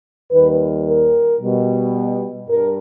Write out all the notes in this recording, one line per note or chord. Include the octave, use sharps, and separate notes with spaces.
D#2 D#3 G3 B4
A#4
B2 G3
G2 A#4